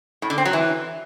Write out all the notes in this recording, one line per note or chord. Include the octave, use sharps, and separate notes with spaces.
A2
D3
C4
F#3
E3